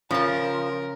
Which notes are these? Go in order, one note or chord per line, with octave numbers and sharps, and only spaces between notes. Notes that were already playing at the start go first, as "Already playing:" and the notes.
C#3 F3 A#4 A5